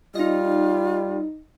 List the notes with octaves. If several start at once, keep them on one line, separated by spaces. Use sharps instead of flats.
G3 D#4 F4 D#5